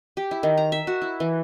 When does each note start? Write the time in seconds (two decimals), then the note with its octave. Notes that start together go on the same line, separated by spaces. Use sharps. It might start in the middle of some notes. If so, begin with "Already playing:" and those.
0.17 G4
0.31 E4
0.43 D#3
0.58 A#5
0.72 E5
0.87 F#4
1.02 E4
1.20 E3